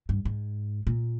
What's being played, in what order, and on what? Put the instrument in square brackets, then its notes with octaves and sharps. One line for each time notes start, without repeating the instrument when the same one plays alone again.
[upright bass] G2
G#2
A#2